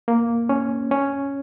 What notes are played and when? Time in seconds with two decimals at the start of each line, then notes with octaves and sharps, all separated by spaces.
0.08 A#3
0.49 C#4
0.91 C#4